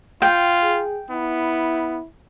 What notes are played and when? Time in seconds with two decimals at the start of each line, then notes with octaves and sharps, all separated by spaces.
0.22 F4 G5
0.63 G#4
1.10 B3 E4